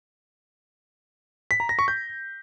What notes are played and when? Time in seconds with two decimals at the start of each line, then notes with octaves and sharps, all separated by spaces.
1.51 B6
1.60 A#5
1.69 A#6
1.79 C#6
1.88 G6